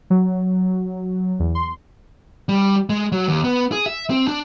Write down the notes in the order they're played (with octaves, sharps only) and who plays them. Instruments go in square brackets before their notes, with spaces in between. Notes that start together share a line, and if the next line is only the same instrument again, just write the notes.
[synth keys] F#3
E2
C6
[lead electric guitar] G3
G#3
F#3
D#2
B3
G#4
E5
C4
D4